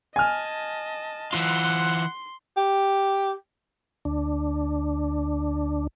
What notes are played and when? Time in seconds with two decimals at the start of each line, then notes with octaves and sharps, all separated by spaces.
0.16 D#5 G#5 A5 F6
1.33 E3 F4 F#5 C6
2.57 G4
4.05 D2 D4